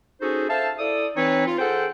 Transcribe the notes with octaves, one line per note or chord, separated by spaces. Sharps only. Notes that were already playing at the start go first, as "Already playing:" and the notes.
C#4 D#4 F#4 G#4 A4 C5
A4 C5 E5 F5 A5
E4 A4 D5 D#6
E3 C4 D#4 B4 C#5
F4
G#4 A4 C5 F#5 G5